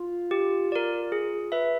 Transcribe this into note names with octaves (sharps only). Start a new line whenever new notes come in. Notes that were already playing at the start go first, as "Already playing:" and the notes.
Already playing: F4
G4
A#4 D5
G#4
B4 E5